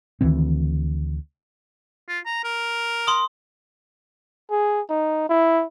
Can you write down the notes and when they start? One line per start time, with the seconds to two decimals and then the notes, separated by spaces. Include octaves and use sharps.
0.21 D2 D#3 E3 C4
2.08 F4
2.26 A#5
2.44 A#4
3.07 C6 D#6
4.51 G#4
4.90 D#4
5.29 E4